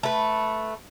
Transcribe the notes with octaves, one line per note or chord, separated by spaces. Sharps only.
A3 B4